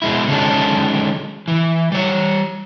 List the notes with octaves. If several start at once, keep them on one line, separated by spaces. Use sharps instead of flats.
B2 G#3 E4
D3 D#3 F#3 G#3 C#4 D4
E3
G3 C#5